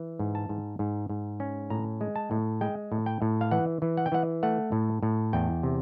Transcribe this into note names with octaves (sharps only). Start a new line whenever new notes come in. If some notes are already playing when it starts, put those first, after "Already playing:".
Already playing: E3
G#2
A5
G#2
G#2
G#2
C#4
A2 A#5
G#3
A5
A2
G#3 G5
A2
G5
A2
F5
E3 F#5
E3
F#5
G5
E3 F#5
A3 F#5
A2
A2
E2 G5
C3